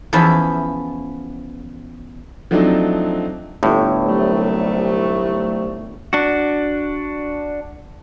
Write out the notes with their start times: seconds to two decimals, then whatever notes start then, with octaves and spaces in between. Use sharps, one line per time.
0.13 E2 F3 C#4 E4 B4
2.51 F3 F#3 A3 C4 D4 D#4
3.63 G1 A2
4.05 C2 F#3 A3
6.13 D4 F#4